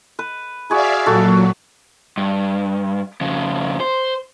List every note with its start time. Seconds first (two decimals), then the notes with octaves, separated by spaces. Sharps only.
0.19 B4
0.70 F#4 G#4 D5 E5 F5 B5
1.06 A#2 F#3 F#4 A4
2.18 G2
3.21 F2 C#3
3.80 C5